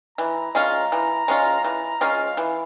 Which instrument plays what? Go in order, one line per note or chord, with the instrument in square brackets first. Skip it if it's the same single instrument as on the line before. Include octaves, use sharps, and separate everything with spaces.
[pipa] E3 [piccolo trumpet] A#5
[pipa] G#3 C#4 F4
E3
G#3 C#4 F4
[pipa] E3 [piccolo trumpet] A#5
[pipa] G#3 C#4 F4 [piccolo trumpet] F5
[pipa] E3